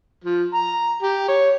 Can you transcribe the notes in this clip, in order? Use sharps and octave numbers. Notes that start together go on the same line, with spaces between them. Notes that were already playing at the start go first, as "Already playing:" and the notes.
F3
A#5
G4
C#5